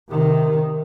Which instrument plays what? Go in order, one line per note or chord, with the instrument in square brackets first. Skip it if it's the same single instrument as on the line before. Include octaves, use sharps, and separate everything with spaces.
[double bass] C3 D#3